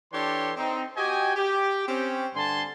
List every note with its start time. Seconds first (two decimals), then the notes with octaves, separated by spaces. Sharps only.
0.12 E3 D4 G4 A4 C#5 C6
0.57 C4 D#4
0.96 F#4 G4 D#5 G5 G#5
1.36 G4
1.87 C4 C#4 G4
2.35 G2 D3 G#5 A5 C6